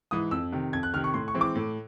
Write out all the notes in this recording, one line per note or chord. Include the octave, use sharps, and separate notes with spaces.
G#2 E3 D#6
F2 E6
C3 D#3
F2 G#6
F#6
C3 D#3 F6
C#6
A2 C6
C#6
E3 G#3 C4
D6
A2